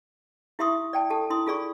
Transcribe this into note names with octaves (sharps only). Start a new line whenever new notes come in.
E4 G4 E5 C6 C#6 D#6
D5 G5 A5
G4 A4 A5
E4 C6 D#6
F4 G#4 D5 C#6